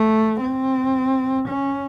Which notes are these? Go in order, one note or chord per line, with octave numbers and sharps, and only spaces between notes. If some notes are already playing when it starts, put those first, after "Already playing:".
Already playing: A3
C4
C#4